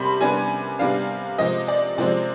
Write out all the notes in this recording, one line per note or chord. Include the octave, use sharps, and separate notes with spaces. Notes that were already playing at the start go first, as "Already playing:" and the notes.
Already playing: C3 G3 B3 B5 C6
C3 G3 B3 D4 G#5
C3 G3 B3 D4 F5
C3 F3 G#3 C4 D#5
D5
C3 F3 G#3 C4 D5